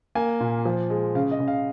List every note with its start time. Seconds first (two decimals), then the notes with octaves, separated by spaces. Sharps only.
0.15 A#3 G#5
0.40 A#2
0.65 F3
0.90 G#3
1.15 C#3 F5
1.31 D#5
1.40 C#3
1.48 F5